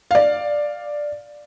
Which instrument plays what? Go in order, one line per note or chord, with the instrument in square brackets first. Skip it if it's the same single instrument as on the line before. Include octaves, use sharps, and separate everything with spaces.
[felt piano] D5 F5